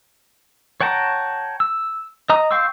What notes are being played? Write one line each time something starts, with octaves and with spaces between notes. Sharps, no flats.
C#5 F#5 G5 A5 A#5
E6
D#5 A#5 D#6
F5 G5 C6 C#6 E6